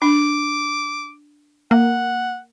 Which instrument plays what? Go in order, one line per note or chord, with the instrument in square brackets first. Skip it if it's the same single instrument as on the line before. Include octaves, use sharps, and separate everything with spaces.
[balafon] D4 [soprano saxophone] D6
[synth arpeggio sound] A#3 [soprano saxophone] F#5